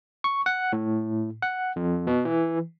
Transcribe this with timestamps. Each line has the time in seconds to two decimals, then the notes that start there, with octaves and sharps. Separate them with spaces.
0.24 C#6
0.46 F#5
0.73 A2
1.42 F#5
1.76 F2
2.07 B2
2.25 E3